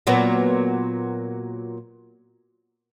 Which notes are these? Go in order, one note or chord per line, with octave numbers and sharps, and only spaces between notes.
A#2 F#3 B3